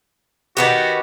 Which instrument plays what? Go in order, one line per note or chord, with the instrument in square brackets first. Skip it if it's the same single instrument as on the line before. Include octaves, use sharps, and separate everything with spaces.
[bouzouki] D#3 B3 G4 [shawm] F#4